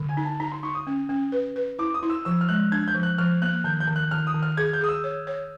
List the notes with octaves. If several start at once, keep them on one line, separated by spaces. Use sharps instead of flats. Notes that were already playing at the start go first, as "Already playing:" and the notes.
Already playing: D3
G#5
D#4
A5
D#4 A#5
C6
D#4 C#6
D#6
C#4
C#4
B4
B4
E4 D6
D#6
E4
E6
F3 E6
F6
G#3 F#6
D4 G#6
G6
F3
F#6
F3 F6
A#3 F#6
D#3 G6
G6
D#3
F#6
D#3 F6
D#6
D#3
F6
G#4 G#6
G6
G#4 D#6
E6
C#5
C#5